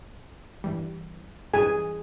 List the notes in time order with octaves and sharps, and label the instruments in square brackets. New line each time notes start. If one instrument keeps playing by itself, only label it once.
[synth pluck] G2 E3 G3
[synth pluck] G2 E3 G3 [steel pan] G#4 G#5